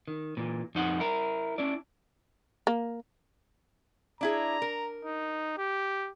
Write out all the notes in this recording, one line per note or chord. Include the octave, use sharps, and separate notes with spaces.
D#3
A#2 E3
F2 D#4 F#5
E4 A#4
C#4 D4 E4 D5
A#3
D4 E4 G#4 A#5
A#4
D#4
G4